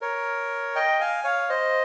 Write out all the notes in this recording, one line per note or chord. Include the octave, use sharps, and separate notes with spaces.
A#4 C#5
D#5 G5
F5 G#5
C#5 F5
C5 D#5